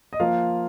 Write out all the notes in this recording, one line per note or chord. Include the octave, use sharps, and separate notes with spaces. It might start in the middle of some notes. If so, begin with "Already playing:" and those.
D#5
F3 A#3 F4 F5